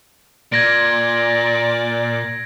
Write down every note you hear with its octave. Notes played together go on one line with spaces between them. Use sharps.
A#2 D5 G#6 A#6 D7